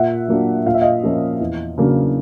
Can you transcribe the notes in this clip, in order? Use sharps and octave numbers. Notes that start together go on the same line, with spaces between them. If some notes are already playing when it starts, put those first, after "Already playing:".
Already playing: A#2 E5 F#5
F#3 A#3 D4
A#2 F5
E5
D#5 F5
F3 A#3 C#4
E2
C#3 F#3 A#3 D4